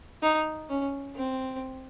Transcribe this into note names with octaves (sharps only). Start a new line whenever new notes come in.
D#4
C#4
C4